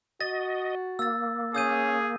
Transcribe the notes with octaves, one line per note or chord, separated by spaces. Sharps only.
F#4 D#5 A6
A#3 E6 A6
C#4 G#4 D#6 G6 D#7